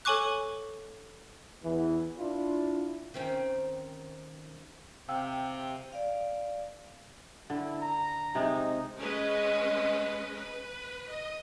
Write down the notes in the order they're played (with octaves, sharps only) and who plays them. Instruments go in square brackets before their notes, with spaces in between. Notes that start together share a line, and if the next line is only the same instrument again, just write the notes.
[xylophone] A4 C#5 G#5 C#6 D6 F#6
[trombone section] E2 E3
D4 E4 F4
[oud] D#3 C4 C#4
[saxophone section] C3 [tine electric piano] F5 G5 E6
[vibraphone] D5 F5
[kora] D3 [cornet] E4
[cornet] A#5
[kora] C3 G#3 [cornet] D#4
[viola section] G#3 C#4 B4 D#5
B4
D#5